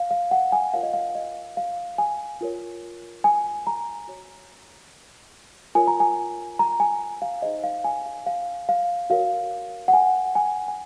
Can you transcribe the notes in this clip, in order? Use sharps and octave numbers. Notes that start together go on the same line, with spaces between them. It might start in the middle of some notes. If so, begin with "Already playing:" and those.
Already playing: F5
F5
F#5
G#5
F4 A#4 C#5 F5
D#5
F5
D#5
F5
G#5
F4 A#4 C#5
G#5
A#5
F#4 C#5
F4 A#4 C#5 G#5
A#5
G#5
A#5
G#5
F5
D#4 G#4 C5 D#5
F5
G#5
F5
F5
F5
F#4 A#4 C#5 F5
F#5
G#5
G#5
G#5